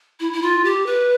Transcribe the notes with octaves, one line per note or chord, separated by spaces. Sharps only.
E4
E4
F4
G4
B4